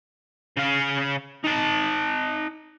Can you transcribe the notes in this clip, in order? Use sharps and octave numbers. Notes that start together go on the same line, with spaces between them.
C#3 F5
D#4 A5